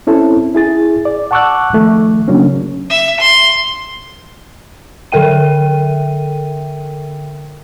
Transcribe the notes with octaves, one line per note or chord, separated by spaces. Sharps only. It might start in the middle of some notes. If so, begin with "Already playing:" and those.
C4 C#4 E4 A4
E4 G#4 A6
D5
F#5 A5 C#6 D6 E6 F#6
D#3 F3 A3
C#3 F#3 A#3 C#4 D4
E5
C6
D3 A4 A#4 E5 G5 D#7